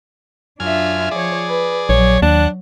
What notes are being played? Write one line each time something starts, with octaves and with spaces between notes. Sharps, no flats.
F#2 D4 F4 E5 G#5 F6
F3 G#4 C#5 D5
B4
A#1 F#3 C#5
D#2 D4 F#5